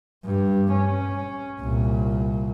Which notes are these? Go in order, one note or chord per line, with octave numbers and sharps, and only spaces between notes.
G2
C#4
C2 A#2